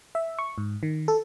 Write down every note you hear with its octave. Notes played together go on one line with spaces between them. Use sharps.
E5
C#6
G#2
D#3
A4